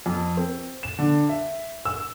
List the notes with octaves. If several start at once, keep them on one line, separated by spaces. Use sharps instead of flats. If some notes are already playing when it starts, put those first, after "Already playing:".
F2
C4
E7
D3
E5
E6